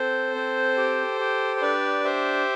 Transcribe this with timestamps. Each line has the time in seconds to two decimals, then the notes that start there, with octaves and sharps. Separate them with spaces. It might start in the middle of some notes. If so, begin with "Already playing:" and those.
Already playing: C4 A4 C5
0.35 C4
0.77 G4
1.20 G4
1.56 C5
1.62 D4 B4 D5
2.04 G4 C5 E5